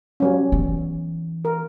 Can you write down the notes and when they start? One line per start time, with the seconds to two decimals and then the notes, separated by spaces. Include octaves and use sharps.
0.20 F#3 G3 C#4
0.52 E3 B3
1.45 A#4